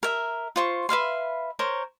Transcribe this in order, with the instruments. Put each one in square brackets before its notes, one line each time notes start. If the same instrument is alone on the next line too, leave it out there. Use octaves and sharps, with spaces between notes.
[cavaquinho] A#4 E5
F4 C5 C#6
B4 E5 F5 C6
A#4 C5 C#5